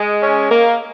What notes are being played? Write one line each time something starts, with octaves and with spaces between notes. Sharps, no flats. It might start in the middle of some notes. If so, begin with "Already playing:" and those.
Already playing: G#3
C#4
A#3